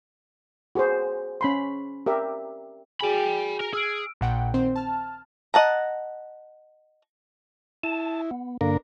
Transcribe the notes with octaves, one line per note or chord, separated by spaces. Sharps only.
F#4 G#4 B4 C5
C#4 B5 C6
G4 A#4 E5
F#4 G#4 G5 G#5 B5
A#4
G#4 E6 F6 D7
A#1 A#2 F#5 G5
D#3 C4 C5
A5 F6
D#5 F#5 A5 A#5
E4 A5
B3
G2 D3 A#3 D4 A#4